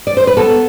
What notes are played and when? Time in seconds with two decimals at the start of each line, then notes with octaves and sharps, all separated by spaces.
0.07 D5
0.17 C5
0.27 B4
0.37 B3 A4